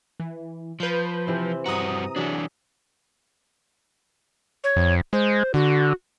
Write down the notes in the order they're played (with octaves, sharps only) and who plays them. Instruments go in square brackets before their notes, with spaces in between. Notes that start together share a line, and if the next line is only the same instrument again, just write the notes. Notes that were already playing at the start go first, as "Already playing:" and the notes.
[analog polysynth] E3
[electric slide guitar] F3 [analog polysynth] B4 G6
[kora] C3 E3 C4
[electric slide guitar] G2 F#4 [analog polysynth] A#5 D#6
[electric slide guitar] E3 D4 [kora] F#3 G#4 E5
[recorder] C#5
[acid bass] F2
[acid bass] G#3 [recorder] C5
[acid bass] D3 [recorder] F#4